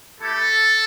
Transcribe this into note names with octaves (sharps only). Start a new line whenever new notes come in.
A3 E4 G4 A4